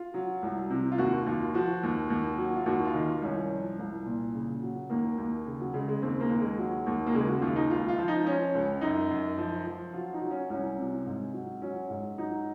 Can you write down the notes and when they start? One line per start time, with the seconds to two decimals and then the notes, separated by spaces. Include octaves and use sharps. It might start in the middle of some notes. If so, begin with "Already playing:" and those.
Already playing: F4
0.14 F#3
0.42 C2
0.70 C3
0.92 F4
0.98 D#2 F#4
1.26 D#2 F4
1.54 F3 F#4
1.83 D#2
2.10 D#2
2.38 F#3
2.56 F4
2.66 D#2 F#4
2.85 F4
2.94 D#3
3.04 F4
3.22 C2 C#4
3.50 F3
3.79 C2
4.06 A#2
4.34 C#3
4.62 F#3
4.90 D#2 A#3
5.18 D#2
5.46 C#3
5.60 F#3
5.74 C#3 G#3
5.88 G#3
6.02 D#2 C4
6.20 A#3
6.30 D#2
6.39 G#3
6.58 F#3
6.86 D#2
7.06 A#3
7.14 C#3 G#3
7.28 F#4
7.41 D#2 F4
7.56 D#4
7.70 C#2 F4
7.88 F4
7.98 F3
8.08 D#4
8.26 F3 C#4
8.55 C#2
8.81 F#2 D#4
9.10 F#2
9.38 F3
9.66 F3
9.93 F#3 F4
10.13 D#4
10.22 F#3
10.31 C#4
10.50 C2 C#4
10.78 C3
11.06 G#2
11.33 F#3
11.62 F#3 C#4
11.90 G#2
12.18 F#3 D#4